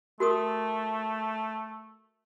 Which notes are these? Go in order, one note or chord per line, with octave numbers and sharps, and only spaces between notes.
A3 F#4 A#4 D#6